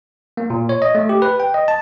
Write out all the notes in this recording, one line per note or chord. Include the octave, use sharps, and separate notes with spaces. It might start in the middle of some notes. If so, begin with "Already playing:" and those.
A#3
A#2
C#5
D#5
A3
G4
B4
G5
D#5
A5